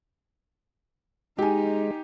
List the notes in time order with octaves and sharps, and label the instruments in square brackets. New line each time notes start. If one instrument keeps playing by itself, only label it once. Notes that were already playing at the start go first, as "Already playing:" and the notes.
[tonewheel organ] G#3 [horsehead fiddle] D#4 [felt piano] G4 G#5